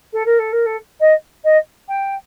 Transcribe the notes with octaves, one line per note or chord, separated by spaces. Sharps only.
A4
A#4
A4
A#4
A4
D#5
D#5
G5